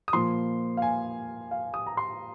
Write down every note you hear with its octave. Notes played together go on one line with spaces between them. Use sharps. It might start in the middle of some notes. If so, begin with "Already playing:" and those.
D#6
A#2 F3 A#3 C6
F5
G#5
F5
D#6
A#5
C6